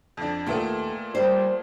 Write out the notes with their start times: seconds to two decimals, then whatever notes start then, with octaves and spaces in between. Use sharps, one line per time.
0.17 F2 D4
0.46 D#2 A#2 A3 B3 A4
1.15 G3 C5